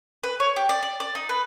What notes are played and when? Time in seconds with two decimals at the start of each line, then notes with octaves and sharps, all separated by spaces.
0.23 B4
0.40 C#5
0.56 G4
0.69 D5
0.83 D5
1.00 D5
1.15 D#4
1.29 B4